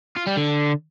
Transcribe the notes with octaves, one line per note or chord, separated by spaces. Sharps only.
F4
G3
D3